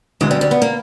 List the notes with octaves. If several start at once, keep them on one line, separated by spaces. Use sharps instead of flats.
D2 D3 F#3 G#3 B3
G3
G3
B3
A#3